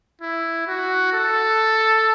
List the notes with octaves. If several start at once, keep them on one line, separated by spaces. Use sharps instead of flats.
E4
F#4
A4